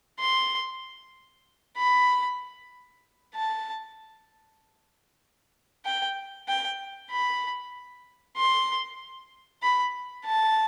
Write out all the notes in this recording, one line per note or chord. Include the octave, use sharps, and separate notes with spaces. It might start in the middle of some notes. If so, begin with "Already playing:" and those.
C6
B5
A5
G5
G5
B5
C6
B5
A5